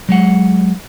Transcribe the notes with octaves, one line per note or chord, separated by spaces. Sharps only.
F#3 G#3 F#5